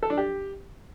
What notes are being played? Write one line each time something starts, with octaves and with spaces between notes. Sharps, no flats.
A4
D4
G4